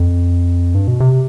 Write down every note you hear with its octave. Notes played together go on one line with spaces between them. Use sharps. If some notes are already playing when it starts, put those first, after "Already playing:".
Already playing: F2
G2
B2
C3